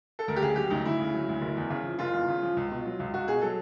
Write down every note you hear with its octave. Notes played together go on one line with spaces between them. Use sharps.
A4
D2 A#4
G4
C#3 G#4
F#3 G4
D2 D#4
D2 E4
C#3
F#3
D2
F#1
E2
C#3
F3
F#1 F4
E2
C#3
F3
C#2
B2
F#3
C#2
C#2 F#4
B2 G#4
F#3 A4